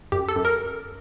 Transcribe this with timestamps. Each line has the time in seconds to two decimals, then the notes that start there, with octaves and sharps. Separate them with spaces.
0.12 F#2 G4
0.29 A4
0.36 F#2
0.45 A#4